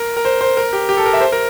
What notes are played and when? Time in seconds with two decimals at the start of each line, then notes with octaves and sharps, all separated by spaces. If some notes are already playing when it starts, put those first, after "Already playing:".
Already playing: A#4
0.17 A#4
0.25 C5
0.41 C5
0.57 A#4
0.73 G4
0.89 G4
0.97 A4
1.06 A#4
1.13 E5
1.21 C5
1.32 A#4